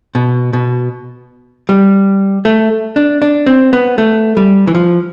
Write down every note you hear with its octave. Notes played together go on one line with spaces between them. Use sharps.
B2
B2
G3
A3
D4
D4
C4
B3
A3
G3
E3
F3